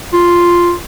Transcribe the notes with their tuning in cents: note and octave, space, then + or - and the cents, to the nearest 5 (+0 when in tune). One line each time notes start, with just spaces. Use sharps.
F4 +0